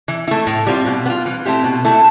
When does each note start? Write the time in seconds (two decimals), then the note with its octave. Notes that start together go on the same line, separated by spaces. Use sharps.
0.08 E3
0.28 A3 E4
0.47 A2
0.67 G3 C4 F4
0.86 B2
1.06 B3
1.10 F4
1.26 E3
1.45 A3 C4 E4 G4
1.64 B2
1.85 A3 E4 A4